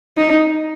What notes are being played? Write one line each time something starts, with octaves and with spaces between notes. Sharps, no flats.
D#4